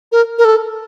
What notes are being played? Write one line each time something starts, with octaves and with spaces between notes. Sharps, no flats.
A#4
A#4
A4